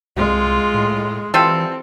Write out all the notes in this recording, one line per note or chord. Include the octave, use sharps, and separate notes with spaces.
C2 G#3 F4
A2
E3 G3 C4 F4 A4